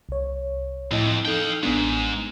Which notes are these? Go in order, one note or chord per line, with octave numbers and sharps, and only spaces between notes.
C2 C#5
F2 A2 E4 D#5
D#4 A4 F5 G5 D#6
A1 G#2 B3 D4